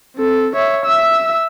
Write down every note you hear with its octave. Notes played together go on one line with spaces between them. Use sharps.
C4 A4
C#5 E5
E5 E6